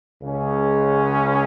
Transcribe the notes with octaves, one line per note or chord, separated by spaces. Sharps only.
C#2 C#3 G#3 C#4